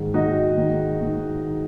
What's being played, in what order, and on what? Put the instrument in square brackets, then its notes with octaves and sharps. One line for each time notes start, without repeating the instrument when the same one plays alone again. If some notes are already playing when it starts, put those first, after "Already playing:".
Already playing: [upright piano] G#2 D#3
D#3 D#4 F#4
D#3
D#3